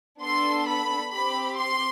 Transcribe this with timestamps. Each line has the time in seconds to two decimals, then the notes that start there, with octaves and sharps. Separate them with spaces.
0.21 B3 D4 A4 C6
0.67 B5
1.12 C4 G4 B5
1.57 C6